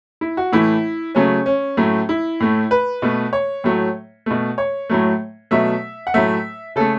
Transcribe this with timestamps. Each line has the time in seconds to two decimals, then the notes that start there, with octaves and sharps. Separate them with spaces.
0.21 E4
0.37 F#4
0.52 A2 E3 A3 E4
1.15 C#3 F#3 A3 C#4
1.46 C#4
1.77 A2 F#3 A3
2.09 E4
2.40 A2 A3
2.71 B4
3.02 B2 A3
3.33 C#5
3.64 A2 F#3 A3
4.26 B2 A3
4.58 C#5
4.90 A2 F#3 A3
5.51 B2 F#3 A3 E5
6.07 F#5
6.14 A2 F#3 A3 E5
6.76 C#3 A3 A4